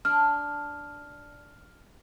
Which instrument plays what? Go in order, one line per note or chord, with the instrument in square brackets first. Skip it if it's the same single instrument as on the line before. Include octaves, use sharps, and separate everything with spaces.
[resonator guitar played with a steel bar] D4 [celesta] F6